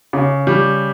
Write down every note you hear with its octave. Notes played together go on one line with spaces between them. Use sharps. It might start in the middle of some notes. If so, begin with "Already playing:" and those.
C#3
G3